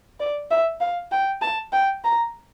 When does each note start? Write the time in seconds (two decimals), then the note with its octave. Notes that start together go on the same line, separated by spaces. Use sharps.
0.20 D5
0.51 E5
0.81 F5
1.12 G5
1.42 A5
1.73 G5
2.04 A#5